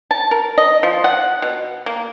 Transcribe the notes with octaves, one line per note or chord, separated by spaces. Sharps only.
A5
A#4
D#5
F3
F#5
B2
A#3